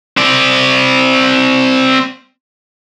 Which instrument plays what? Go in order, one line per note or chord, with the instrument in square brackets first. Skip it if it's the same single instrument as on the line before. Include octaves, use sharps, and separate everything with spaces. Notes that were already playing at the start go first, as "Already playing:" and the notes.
[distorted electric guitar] C4 D5